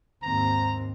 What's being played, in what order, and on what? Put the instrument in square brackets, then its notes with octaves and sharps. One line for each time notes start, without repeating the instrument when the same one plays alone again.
[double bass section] D#2 G#2 C4 [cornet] A#5